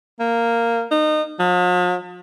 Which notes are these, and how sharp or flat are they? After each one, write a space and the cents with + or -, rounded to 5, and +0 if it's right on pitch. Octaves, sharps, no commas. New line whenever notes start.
A#3 -5
D#4 -25
F3 +45